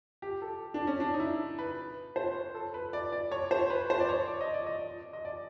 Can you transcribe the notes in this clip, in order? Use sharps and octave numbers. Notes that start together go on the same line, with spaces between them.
G4
A4
D4
C#4
D4
D#4
E4
B4
C5
C#5
A4
B4
D5
D5
C#5
C5
B4
C5
D5
C#5
D5
D#5
D5
D#5
D5
D#5
D5